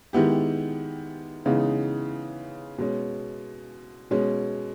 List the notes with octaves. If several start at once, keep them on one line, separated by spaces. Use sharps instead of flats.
D#3 G#3 B3 E4 G4
C#3 E3 G#3 B3 D#4
B2 G#3 C#4
B2 G#3 C#4